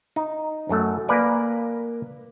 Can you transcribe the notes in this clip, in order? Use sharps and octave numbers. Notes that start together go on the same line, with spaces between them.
D#4
F#2 F#3 A3
A#3 A#4 B4 D5 G#5